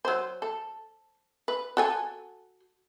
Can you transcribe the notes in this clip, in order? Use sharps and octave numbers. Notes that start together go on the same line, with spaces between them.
F#3 C5
A4
B4
F#4 A4 G#5